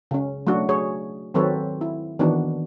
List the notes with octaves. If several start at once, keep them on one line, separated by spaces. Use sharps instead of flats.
C#3 C#4
F#3 A3 D4 F#4
G#4 C#5
D#3 F#3 C4 A4 B4 C#5
E4
D#3 E3 B3 D4 F#4